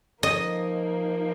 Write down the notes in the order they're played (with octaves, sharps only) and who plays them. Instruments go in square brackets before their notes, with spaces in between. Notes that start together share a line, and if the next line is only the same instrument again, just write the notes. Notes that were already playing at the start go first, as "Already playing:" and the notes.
[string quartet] F3 A#3 D#4 [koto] D#5